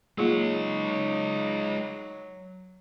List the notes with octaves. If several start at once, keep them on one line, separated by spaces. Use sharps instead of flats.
F#3 G#3 A#3 D#4 F4 G#4 C#5